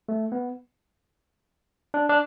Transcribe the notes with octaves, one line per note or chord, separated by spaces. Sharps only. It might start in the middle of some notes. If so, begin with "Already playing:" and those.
A3
B3
D4
D4